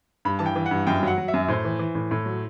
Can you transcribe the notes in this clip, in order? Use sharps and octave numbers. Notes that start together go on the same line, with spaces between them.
G2 B5
E3 A5
G5
E3
F#5
G2
F#2 G5
F#3 F#5
F#3
E5
F#2
A2 C5
E3
E3
A2
A2
F#3